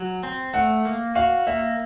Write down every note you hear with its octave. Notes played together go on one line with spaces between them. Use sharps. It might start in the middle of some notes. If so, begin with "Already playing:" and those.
Already playing: F#3
C4
A3 F#5
A#3
F#4 F5
A#3 E5